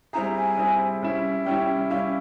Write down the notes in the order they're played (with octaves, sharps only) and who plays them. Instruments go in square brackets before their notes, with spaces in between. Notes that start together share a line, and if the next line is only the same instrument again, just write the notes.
[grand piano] G3 C4 E4 G#4 [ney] A#5
[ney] G#5
[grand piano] G3 C4 E4 G#4
G3 C#4 E4
[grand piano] G3 C#4 E4 [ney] G5
[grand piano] G3 C#4 E4 G4 [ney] F5